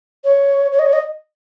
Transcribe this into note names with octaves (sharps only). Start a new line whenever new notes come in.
C#5
C#5
D#5
C#5
D#5